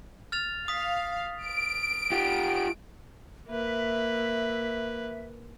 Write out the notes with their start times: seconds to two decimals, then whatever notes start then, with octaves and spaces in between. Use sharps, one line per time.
0.32 F6 A6 F7
0.68 F5 D#6 B6
1.44 D7
2.12 F4 G4
3.48 A#3 B4 E5